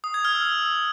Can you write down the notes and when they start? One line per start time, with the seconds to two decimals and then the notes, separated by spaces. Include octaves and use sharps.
0.04 D#6
0.14 G#6
0.25 F6
0.35 E6